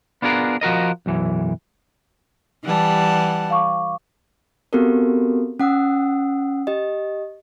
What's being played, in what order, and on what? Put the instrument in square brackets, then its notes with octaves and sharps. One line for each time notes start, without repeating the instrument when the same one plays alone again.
[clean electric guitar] B3 D4 F4 G#4 A#4
F3 F#4 A#4 D#5
B1 F#2 E3
[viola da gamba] E3 G3 [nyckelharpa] F#5 A5
[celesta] F5 C#6 D6
[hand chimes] B3 C4 F#4 G4 A4 A#4
C#4 F#5 D#6 E6
G4 D#5